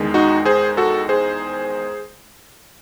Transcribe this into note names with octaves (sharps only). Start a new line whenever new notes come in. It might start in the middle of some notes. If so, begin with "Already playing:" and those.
Already playing: E2 D#3 G#3
D#4 F#4
G#4 C5
F#4 A4
G#4 C5